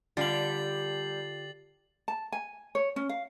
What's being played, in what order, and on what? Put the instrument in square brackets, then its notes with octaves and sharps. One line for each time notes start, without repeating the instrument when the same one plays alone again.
[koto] D3 [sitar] G3 [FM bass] F4 [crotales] A6 C7 F#7
[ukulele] A5
G#5
C#5
C#4
F5